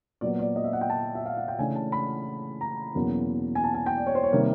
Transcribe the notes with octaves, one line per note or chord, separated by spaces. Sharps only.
A#2 F#3 B3 D5
D5
D#5
E5
F#5
G5
A5
E5
F5
F#5
G5
C#3 E3 A3 D4 G#5
A5
B5
A#5
E2 B2 F#3 A#3 C#4
G#5
A5
G#5
G5
D5
C#5
C5
C#5
C3 D#3 G3 A#3